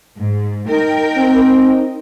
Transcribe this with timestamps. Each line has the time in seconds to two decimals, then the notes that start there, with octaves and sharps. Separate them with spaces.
0.19 G#2
0.68 D#4 A#4 G5
1.16 C4